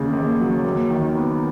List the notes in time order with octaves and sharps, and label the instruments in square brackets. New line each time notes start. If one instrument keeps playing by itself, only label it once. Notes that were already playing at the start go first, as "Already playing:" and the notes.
Already playing: [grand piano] D#2 C#3
D#2
F#3
D#2
D#3
B3